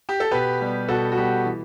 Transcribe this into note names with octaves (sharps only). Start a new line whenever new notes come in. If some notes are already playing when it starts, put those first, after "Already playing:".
G4
A4
B2 G4 B4
G3 B3
B2 F#4 A4
F#4
G3 B3 G4
E3